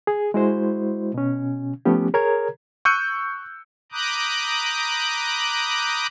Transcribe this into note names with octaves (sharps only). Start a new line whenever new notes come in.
G#4
G#3 E4 F#4 C5
B2 C#4
F3 A3 B3 C#4 G4
G#4 A#4 C#5 A#5 G#6
C#6 E6 F#6 G6 C#7 D#7
A#5 B5 D6 D#6 F#6 G6